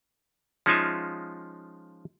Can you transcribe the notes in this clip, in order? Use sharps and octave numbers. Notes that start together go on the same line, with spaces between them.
F3 G#3 C#4 D#4 F4 E5